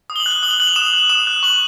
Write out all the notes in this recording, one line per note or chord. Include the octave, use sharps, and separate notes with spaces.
D#6
G7
F#7
F#6
G7
D#6 F#7
G7
F#6 F#7
F7
D#6 E7
F#6
D#6 E7
F#6
C#6 F#7